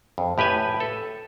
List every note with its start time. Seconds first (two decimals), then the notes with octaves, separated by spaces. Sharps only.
0.18 F2
0.38 A2 G4 B4 G#5
0.80 A4